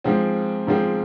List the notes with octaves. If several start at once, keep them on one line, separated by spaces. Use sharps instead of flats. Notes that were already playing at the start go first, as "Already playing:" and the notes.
G#2 F3 G#3 C4
G#2 F3 G#3 C4